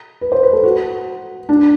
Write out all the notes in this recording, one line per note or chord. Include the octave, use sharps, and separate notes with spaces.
B4
C5
B4
A4
F#4
D4